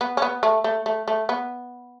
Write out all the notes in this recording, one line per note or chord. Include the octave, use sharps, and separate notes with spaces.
B3
C#4
B3
A3
A3
A3
A3
B3